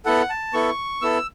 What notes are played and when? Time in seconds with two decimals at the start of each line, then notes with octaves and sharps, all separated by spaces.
0.05 B3 E4 A4 F#5
0.30 A5
0.53 B3 E4 A4 C#6
1.02 B3 E4 A4 E6